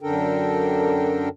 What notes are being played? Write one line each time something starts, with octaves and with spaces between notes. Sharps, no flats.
F#2 D3 D4 A4 A#4 G5